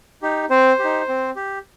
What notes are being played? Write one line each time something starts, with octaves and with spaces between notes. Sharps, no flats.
D#4 G4
C4 C5
G4
D#4
C4
G4